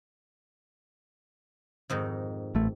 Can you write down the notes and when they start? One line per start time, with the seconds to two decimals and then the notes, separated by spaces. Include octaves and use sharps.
1.90 F2 G#2 D#3
2.55 A1 A3